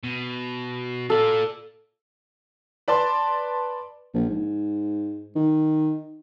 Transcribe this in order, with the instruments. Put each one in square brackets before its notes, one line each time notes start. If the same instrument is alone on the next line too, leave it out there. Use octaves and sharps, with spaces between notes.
[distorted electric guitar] B2
[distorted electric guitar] F4 D5 [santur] A4
[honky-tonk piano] B4 D5 A5 C6
[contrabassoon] A#1
G#2
D#3